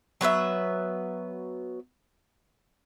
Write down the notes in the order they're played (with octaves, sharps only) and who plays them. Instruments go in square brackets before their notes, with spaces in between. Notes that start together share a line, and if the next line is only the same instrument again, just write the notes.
[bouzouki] F#3 B3 B4 E5